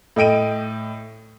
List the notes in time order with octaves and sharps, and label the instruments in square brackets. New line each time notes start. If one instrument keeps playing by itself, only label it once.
[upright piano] A2 D#5 G5 D7 D#7